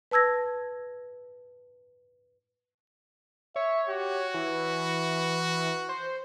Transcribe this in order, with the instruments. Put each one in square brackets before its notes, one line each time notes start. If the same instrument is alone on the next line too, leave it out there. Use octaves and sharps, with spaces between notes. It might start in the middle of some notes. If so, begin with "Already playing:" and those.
[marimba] B4 A5 E6 G#6 A#6
[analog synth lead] C#5 [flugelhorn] E5
[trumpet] F#4 [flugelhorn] G4
[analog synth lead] E3 [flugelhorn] B4
[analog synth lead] C5